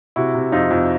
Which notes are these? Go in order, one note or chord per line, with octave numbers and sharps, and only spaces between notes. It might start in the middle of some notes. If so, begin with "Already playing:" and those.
C3 E4 F#4
C3
F2 D#4 F4
F2